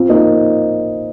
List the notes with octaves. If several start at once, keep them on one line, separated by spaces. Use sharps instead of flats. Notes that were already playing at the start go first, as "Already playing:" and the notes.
Already playing: C4 F4
A#3 D#4